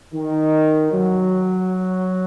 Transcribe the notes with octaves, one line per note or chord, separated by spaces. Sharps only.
D#3
F#3